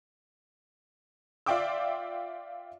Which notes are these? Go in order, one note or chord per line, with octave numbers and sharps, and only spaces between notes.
F4 D5 E5 G5 D6 E6